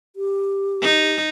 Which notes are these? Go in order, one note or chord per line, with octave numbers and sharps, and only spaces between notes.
G4
D#4